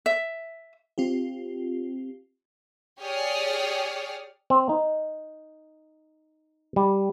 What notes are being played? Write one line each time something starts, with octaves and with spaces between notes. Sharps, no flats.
E5
C4 F4 G4
G4 G#4 C#5 D5 D#6 F6
C4
D#4
G3